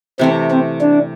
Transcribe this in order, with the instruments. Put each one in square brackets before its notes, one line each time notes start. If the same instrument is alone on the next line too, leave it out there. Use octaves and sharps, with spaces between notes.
[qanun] C3 E3 A3 [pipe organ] C4
[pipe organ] C4
D4